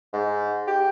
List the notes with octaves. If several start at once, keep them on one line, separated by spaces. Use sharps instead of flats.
G#2
G4